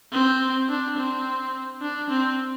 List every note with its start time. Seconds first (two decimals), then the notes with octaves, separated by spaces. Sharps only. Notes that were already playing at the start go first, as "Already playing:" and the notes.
0.13 C4
0.69 D4
0.97 C4
1.82 D4
2.10 C4